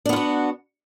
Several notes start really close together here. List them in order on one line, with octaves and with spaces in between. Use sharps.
D4 B3 F4 F#4